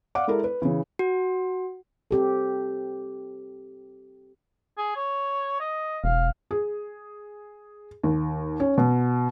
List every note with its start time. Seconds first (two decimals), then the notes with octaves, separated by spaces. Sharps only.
0.15 D5 F5 F#5 D6
0.27 G#3 E4 A4 A#4
0.44 B4
0.62 C#3 E3
0.99 F#4
2.11 C4 G4 A4
4.78 G#4
4.96 C#5
5.60 D#5
6.04 E1 F5
6.51 G#4
8.03 D#2
8.60 C#4
8.78 B2